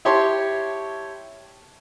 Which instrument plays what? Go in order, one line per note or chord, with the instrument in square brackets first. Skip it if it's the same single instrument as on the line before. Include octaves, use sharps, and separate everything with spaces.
[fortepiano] E4 G4 C#5 A5 C6